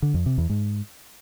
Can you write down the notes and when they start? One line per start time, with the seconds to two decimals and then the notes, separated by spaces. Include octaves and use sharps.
0.02 D3
0.14 F2
0.26 C3
0.38 E2
0.49 G#2